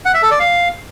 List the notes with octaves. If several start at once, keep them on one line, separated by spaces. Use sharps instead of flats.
F#5
E5
A4
D5
F5